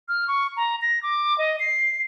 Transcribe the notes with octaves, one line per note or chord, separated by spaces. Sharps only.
F6
C#6
A#5
A#6
D6
D#5
C7